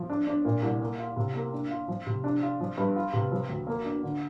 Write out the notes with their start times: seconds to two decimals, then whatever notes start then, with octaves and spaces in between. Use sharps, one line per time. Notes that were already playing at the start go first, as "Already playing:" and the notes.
Already playing: F3
0.10 D4
0.27 D4
0.45 A#2
0.62 C2
0.81 A#3
0.99 F4
1.16 C3
1.35 A#3
1.53 D4
1.71 F4
1.88 F3
2.07 C3
2.24 D4
2.42 F4
2.60 F3
2.77 G2
2.96 F4
3.13 C3
3.31 F3
3.49 D2
3.67 A#3
3.85 D4
4.03 D3